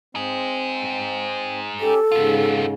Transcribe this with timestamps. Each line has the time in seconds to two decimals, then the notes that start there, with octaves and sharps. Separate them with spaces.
0.15 C4 D#4 G#4
1.80 C#4 G4 A4
2.12 G#2 C#3 B3 F4